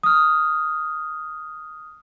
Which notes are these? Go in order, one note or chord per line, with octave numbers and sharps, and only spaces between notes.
D#6 F6